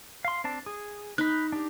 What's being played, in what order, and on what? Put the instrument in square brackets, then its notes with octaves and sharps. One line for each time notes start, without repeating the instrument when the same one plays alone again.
[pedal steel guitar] F5 C6
C4 D4 A5
G#4
[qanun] D#4 [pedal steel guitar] B5 F#6
[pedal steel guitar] D4 G4